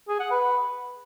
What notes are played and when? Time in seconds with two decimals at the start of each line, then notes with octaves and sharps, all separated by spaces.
0.08 G#4
0.20 F#5
0.31 B4